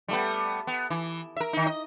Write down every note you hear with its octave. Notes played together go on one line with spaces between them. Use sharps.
G3 A3 B3
B3
E3
A#4 E5
D#3 D#4
D#5